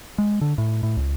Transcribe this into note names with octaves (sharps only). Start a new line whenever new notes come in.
G#3
D3
A2
A2
C#2